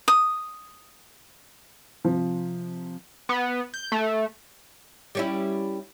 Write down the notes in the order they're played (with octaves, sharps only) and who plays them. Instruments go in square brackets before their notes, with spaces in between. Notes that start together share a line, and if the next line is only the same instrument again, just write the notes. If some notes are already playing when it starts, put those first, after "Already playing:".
[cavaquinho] D#6
[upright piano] C3 F3
[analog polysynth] B3
G6
A3
[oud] G3 C#4 E4